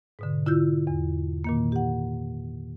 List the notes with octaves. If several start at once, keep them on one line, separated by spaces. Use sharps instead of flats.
G#2 B2 D3
D3 E4 F4 E6 G6
E2
A#2 D#3 A#3
G4 F#5